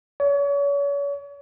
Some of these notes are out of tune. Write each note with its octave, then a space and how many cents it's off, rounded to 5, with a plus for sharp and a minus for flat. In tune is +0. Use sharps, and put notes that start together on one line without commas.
C#5 +35